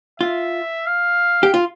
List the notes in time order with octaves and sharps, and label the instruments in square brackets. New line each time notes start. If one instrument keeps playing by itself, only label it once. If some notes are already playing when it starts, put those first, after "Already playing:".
[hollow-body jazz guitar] F4 [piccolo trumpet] E5
[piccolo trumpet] F5
[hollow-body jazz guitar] G4
F4